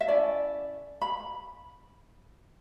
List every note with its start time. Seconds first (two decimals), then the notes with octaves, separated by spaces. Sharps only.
0.01 E5
0.07 C#4 E4 A4 D5
1.02 B5